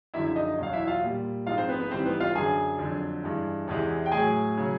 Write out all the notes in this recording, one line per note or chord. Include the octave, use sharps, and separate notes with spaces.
F#2 D3 F3 G#3 E4 E5
D#4 D#5
E2 B2 F#3 F5
E4 E5
F4 F5
A#2 G3
G#2 F3 G#3 F4 F5
C4 C5
B3 B4
B3 B4
G#2 E3 G3 C4 C5
B3 B4
F4 F5
F#2 D3 F#3 G#4 G#5
F2 D3 F#3
G2 E3 G#3
E2 C3 E3 G#3
G5
A2 F#3 G#4 G#5
C#3 F#3